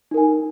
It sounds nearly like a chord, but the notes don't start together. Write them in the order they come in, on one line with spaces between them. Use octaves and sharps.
D#4 A#4 G#5